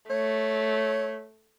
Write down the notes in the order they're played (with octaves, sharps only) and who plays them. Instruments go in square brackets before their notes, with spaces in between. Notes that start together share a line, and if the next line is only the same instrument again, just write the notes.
[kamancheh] A3 [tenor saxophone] C#5